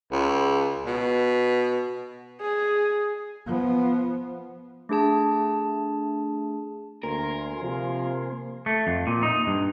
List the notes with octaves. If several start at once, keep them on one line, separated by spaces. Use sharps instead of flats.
C#2
B2
G#4
F3 B3
A3 D4 G#4 A5
D2 A#3 A#4 G#5 C6
C3 F3
A3
F2
A#2
D#4
G2